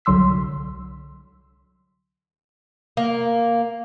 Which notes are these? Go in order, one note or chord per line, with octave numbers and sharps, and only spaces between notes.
C2 D3 F#3 C6 E6 B6
A#3